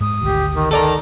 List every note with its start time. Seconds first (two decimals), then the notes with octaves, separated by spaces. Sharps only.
0.01 G#2 D#6
0.22 G#1 D2 G4
0.54 D#3
0.71 D#3 A4 D5 A5 A#5